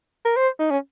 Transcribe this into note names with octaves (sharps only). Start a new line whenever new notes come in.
A#4
C5
D#4
C#4